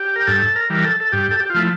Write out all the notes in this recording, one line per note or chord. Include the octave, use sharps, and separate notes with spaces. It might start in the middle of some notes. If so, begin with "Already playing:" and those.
Already playing: G4
A#4
G2 A4
A#4
E3 G3
A4
A4
G2 G4
A4
G4
F4
F3 A3 E4